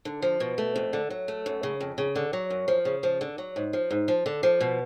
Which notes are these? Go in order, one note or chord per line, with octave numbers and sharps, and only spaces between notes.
D3
F3
B2
A3
F2
D3
F#3
A3
F#2
C#3
F2
C#3
D3
F#3
F#2
F3
C#3
F3
D3
F#3
G#2
F3
G#2
F3
D3
F3
B2